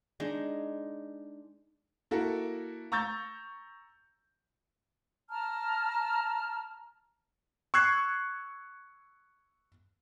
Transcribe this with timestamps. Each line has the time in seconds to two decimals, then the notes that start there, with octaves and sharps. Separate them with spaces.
0.20 G#3 D4 D#4
2.11 A#3 E4 F#4 A4 A#4
2.92 A#5 C#6 E6 G6 A6
5.28 A5 A#5 F6
7.74 C#6 E6 F#6 G#6 C7